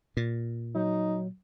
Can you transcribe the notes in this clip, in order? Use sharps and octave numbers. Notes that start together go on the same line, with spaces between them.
A#2
F#3 D#4